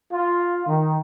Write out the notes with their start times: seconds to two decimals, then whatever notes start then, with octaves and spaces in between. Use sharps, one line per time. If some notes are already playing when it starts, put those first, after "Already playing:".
0.12 F4
0.67 D#3